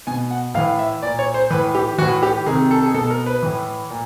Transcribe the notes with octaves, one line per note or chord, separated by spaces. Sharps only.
B2 G#5
F#5
A2 E3 F5
E5
A#2 D5
C#5
C5
A2 E3 B4
G4
A2 E3 F#4
G4
C3 D#3 G#4
A4
G#4
B2 A4
A#4
B4
A2 E3
A#2